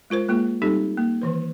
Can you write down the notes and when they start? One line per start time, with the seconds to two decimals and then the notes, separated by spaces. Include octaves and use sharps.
0.10 G#3 F4 A#4 C5
0.28 G#3 A#3 F4 G#4
0.62 G3 C4 D#4 G4 A4
0.97 A#3
1.22 D#3 E3 B4